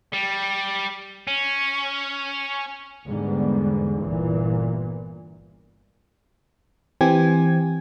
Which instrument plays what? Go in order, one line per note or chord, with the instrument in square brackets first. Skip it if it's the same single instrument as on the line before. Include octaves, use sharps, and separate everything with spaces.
[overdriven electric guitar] G3
C#4
[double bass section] E2 G#2 D3 G3 B3
G1 A#2 E3
[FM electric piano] E3 C4 G4 G#5 G#6